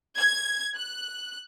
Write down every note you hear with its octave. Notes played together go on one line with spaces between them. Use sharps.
G#6
F#6